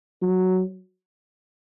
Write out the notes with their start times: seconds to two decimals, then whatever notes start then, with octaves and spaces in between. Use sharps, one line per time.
0.22 F#3